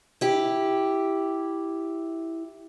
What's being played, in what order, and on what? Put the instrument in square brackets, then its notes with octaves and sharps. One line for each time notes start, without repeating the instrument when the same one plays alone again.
[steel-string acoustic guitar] E4 G4